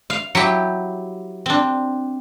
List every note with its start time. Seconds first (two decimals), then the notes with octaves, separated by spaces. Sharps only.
0.10 F5
0.35 F#3 E4 G4
1.46 C4 D4